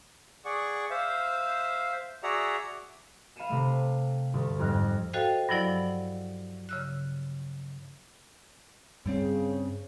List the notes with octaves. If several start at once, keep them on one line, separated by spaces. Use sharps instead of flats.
G#4 D5 F#5 C#6
C5 E5 F5
F#4 G#4 D5 E5 F#5 A#5
F5 B5 C7 C#7 D#7 E7
C3 A3
D2 G2
F2 G#2 G3 F6 F#6 A#6
F#4 A4 C5 D#5 F5 G5
G2 F3 F#3 E4 D5 F#5
C#3 E6 F#6
G2 C#3 G3 C4